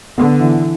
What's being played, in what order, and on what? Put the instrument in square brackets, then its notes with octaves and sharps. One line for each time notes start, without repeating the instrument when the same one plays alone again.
[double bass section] D3 [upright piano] B3
[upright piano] E3